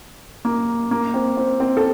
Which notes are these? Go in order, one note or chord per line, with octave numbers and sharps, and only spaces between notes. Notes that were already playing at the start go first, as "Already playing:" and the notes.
A#3
A#3
C4
C4
C4
A4